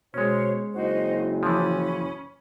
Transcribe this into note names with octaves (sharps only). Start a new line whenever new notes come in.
B2 G#3 C#4 C5 C#5
F#1 D#4 F#4 C5
E3 F3 C#4 B5